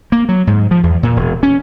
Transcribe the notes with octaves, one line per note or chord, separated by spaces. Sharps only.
A#3
F#3
G#2
F3
E2
A#2
E1
C#4